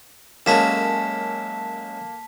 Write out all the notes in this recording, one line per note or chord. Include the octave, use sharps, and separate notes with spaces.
F#2 G#3 A#3 C#4 A4 A5 B6 E7